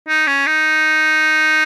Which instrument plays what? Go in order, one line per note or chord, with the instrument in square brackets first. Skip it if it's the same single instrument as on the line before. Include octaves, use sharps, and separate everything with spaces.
[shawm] D#4
C#4
D#4